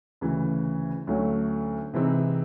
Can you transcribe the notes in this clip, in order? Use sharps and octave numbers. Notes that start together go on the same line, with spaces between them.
D2 C#3 E3
D2 D3 F#3 A3 C#4
C3 E3 G#3 C4 D#4